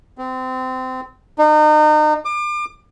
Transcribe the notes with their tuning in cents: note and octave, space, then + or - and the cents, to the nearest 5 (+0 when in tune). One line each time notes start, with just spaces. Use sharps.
C4 -25
D#4 -35
D6 +35